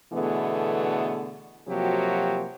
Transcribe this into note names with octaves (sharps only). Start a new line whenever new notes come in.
B2 D3 E3 A3 B3 G#4
C3 F3 F#3 A#3 F#4 G4